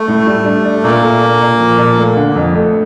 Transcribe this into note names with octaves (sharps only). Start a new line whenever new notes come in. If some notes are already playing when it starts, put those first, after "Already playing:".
Already playing: A3
A2
G3
D4
D4
A#2 A#3
A4
A#2
A#2
F3
A#2
A3
D3
F2
A3